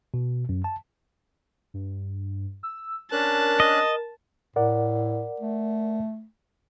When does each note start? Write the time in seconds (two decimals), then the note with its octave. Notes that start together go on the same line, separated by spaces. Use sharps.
0.14 B2
0.49 F#2
0.64 A5
1.74 G2
2.63 E6
3.12 C#4 D4 A#4 A5 F#6
3.60 D#5
4.56 A2 A#4 D5 F#5
5.40 A3